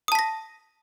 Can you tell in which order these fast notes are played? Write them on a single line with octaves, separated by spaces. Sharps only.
D#6 A5 B6 A#6